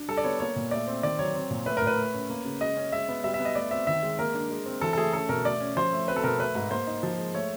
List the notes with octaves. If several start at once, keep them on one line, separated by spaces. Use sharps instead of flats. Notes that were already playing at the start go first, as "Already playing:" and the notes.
Already playing: D4
G3 A4
D5
B3 C#5
A#3 C#5
A#2
A3 D5
C4
D#3 D5
F#3 C#5
C4
A#2
A3 B4
A2 A#4
B4
A3
C#4
A#3
C#3
G#3 D#5
C#4
G#3 E5
B3
G3 E5
E5
B3
D#5
A3 D5
C4 E5
D#3 E5
G#3
A#3 A#4
D4
G#3
C4
E3 A4
A4
A3 G#4
C#4 A4
B2 A#4
A3 D5
C#4
F3 C5
A3
C4 B4
A4
B2 A#4
A3 B4
G#2
A#3 C5
D#4
F3
G#3
A3 C#5